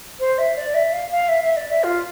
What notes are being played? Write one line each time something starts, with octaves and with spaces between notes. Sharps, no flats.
C5
E5
D5
E5
F5
F5
E5
E5
D5
E5
F4